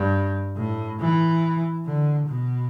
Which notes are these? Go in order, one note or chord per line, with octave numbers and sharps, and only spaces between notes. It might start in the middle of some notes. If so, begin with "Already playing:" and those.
Already playing: G2
A2
E3
D3
B2